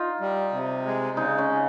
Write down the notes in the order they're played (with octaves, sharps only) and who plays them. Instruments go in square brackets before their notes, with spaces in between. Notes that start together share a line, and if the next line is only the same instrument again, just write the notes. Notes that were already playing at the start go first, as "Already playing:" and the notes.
Already playing: [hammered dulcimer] D#4 F4
[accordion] G3
C3
G#3
[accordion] C#3 [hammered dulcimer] D#4
[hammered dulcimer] C#4
[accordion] C#3